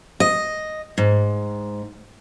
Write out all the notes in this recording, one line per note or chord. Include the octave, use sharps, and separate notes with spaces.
D#5
G#2